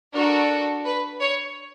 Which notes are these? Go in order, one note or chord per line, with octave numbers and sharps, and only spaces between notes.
D4 F#4 A4 A#4
B4
C#5